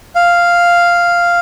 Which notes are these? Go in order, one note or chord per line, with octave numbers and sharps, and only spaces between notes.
F5